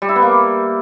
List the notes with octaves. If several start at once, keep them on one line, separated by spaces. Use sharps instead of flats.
G3
E4
B3
A#3